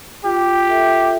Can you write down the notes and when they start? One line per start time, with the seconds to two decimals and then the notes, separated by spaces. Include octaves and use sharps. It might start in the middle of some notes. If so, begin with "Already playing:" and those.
0.24 F4 G4
0.68 A4 E5